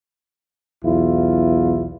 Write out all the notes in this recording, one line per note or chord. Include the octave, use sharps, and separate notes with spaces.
B1 E2 E4 F4